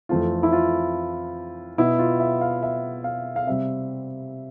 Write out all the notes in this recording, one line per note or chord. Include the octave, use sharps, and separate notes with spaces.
F2 E3 A3 C4 F4
E4
F4
B2 B3 E4
F4
E5
F5
E5
F5
F5
C3 G3 C4 E5